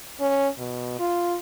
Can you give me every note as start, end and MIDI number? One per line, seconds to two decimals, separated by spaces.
0.20 0.48 61
0.58 0.95 47
0.99 1.37 65